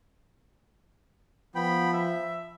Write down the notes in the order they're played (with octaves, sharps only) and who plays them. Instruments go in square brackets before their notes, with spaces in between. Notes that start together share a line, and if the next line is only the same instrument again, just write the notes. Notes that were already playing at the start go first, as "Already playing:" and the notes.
[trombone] F3 [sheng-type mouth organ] B3 G5 B5
[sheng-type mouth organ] E5